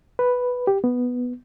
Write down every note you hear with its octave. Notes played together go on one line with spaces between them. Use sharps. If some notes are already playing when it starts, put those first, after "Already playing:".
B4
G4
B3